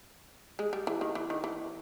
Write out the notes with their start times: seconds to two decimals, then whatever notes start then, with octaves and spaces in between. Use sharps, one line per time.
0.59 G#3
0.73 G3
0.87 E3
1.01 D#3
1.15 E3
1.30 D#3
1.44 E3